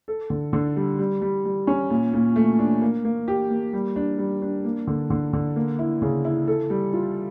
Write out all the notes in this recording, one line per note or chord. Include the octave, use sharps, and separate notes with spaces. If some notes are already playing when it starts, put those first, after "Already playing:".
A4
D3
D3
G3
G3
G3
G3
C#4
A#2
A#2
A3
D4
A#3
A#3
G4
A#3
G3
D4
G3
D4
A#3
D3
D3
D3
A#3
E4
C#3
E4
A4
G3
F4